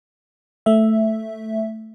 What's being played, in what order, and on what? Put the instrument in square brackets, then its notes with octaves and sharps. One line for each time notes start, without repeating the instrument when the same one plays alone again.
[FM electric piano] A3 E5